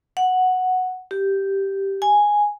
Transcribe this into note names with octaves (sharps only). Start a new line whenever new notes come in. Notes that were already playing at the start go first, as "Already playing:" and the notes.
F#5
G4
G#5